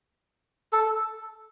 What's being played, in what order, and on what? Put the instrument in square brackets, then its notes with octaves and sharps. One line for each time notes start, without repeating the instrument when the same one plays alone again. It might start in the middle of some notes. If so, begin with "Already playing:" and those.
[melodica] A4